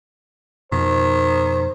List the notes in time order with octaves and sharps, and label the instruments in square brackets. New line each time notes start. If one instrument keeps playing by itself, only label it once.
[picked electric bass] F2 B2 [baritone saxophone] D#3 [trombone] C5